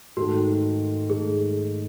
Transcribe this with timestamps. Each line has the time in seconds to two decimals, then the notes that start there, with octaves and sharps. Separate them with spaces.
0.17 G#2 D#3 A3 D#4 F#4
1.10 G#2 D#3 A3 D#4 G#4